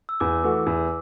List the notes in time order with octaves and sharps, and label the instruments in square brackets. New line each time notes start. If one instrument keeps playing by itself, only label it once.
[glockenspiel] E6
[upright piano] E2 [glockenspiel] D6
[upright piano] E3 A3 F#4
E2